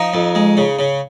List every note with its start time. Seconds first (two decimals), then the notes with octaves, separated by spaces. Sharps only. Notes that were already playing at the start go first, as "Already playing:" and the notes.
Already playing: F3 D#4
0.14 F2
0.35 G#3
0.57 C#3
0.79 C#3